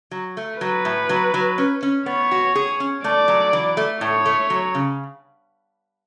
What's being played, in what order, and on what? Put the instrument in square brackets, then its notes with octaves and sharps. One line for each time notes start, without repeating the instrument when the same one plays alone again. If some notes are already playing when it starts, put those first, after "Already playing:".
[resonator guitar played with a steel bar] F#3
A3
[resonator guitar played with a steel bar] F#3 [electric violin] B4
[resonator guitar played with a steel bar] A2
F#3
F#3
C#4
C#4
[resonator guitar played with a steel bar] B3 [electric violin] C#5
[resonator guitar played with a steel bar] F#4
G#4
C#4
[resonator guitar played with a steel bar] A3 [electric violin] D5
[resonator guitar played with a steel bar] F#3
E3
A3
[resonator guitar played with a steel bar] A2 [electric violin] C#5
[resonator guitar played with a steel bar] A3
F#3
C#3